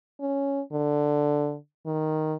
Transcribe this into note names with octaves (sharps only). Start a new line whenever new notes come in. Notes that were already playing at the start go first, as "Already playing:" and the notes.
C#4
D3
D#3